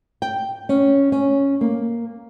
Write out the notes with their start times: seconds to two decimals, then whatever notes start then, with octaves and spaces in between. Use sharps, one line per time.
0.22 G5
0.69 C#4
1.12 C#4
1.61 A#3